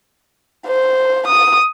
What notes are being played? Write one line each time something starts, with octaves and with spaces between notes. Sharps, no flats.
C5
D#6